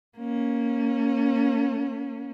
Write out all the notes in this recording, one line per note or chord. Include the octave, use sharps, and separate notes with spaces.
A#3 C#4